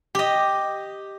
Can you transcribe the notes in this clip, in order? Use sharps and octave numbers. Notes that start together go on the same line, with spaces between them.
G4 D#5